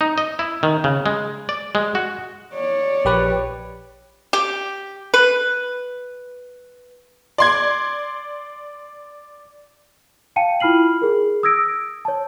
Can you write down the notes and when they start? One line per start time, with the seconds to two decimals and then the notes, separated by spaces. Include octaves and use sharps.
0.01 D#4
0.18 D#5
0.39 E4
0.63 D#3
0.84 C#3
1.06 G#3
1.49 D5
1.75 G#3
1.95 F#4
2.54 C#5 D5
3.05 A#1 G4 B4
4.33 G4
5.14 B4
7.38 D5 C6 G#6
10.36 F5 G5 A5 C#7 D#7
10.60 E4 F4 B5 F6 C7 F#7
11.02 G#4 A#4
11.43 D#6 E6 G#6 A#6 D7
12.05 C#5 A5